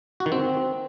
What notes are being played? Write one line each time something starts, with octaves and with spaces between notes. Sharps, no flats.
F#4
D#3
C4